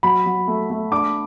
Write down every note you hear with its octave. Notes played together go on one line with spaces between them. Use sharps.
F#3 B5
F#3
A3
A3
D4 D6